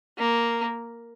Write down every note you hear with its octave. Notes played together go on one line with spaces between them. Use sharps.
A#3